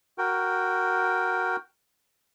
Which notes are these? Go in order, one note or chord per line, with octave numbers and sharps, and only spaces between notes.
F#4 A#4 G5